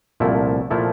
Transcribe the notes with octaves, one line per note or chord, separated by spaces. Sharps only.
C2 A#2 F3 A3 E4
A#2 F3 A3 E4